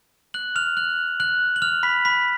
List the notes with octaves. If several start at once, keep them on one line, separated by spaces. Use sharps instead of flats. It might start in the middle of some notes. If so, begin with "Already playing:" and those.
F#6 F#7
F6 F7
F#6 F#7
F#6 F#7
F#7
F6 F7
B5 B6
B5 B6